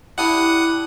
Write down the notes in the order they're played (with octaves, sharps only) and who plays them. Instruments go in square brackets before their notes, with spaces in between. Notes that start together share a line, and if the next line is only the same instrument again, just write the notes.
[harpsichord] D4 E4 G4 [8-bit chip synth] F#5 D#6